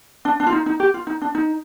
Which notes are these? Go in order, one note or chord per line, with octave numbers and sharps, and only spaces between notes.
D4
D4
F4
D#4
D#4
G4
F4
D#4
D4
D#4